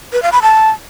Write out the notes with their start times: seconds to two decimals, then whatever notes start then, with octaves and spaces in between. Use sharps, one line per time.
0.13 B4
0.22 F5
0.32 B5
0.42 A5